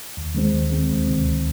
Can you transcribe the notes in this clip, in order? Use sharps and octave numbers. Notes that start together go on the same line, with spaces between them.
D#2
D#3 G#3 C4
D#2
D#3 G#3 C4
D2
C3 D#3
D2